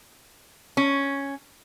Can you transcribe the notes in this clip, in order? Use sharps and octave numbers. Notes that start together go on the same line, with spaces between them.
C#4